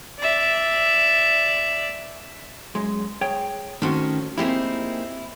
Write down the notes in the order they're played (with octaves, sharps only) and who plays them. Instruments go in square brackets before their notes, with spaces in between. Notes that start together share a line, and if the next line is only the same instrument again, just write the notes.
[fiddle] D5 E5
[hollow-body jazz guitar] F#2 G#3
G#4 C#5 G5
[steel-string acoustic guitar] D#3 C#4 [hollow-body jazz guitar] A3 C4 F#4
[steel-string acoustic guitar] A#3 C4 D#4 [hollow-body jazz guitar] E4 G4 G#4